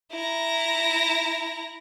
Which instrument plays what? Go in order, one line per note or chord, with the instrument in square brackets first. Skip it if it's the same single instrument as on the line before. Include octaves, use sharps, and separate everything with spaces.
[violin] E4 A#5